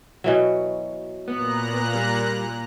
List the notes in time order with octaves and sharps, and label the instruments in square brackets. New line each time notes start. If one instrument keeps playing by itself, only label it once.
[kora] B2 E3 F#3
[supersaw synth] A#2 A#5 F#6 [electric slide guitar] B3
[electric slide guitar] G3